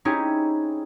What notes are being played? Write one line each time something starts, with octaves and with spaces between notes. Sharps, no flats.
C4 C#4 D#4 E4 G4 G#4